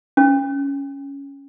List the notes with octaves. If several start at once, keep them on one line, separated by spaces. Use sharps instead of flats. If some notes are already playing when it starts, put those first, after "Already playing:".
C#4